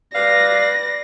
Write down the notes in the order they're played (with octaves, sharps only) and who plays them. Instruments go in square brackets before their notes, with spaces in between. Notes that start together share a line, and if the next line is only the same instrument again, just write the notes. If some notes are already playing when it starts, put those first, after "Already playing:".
[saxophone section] G3 B4 F5 [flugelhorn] D5 [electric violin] A#6